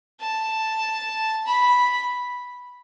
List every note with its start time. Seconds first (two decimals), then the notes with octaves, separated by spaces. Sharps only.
0.20 A5
1.46 B5